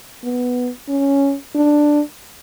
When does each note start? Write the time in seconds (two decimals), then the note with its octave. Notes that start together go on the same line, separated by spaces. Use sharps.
0.23 B3
0.89 C#4
1.55 D4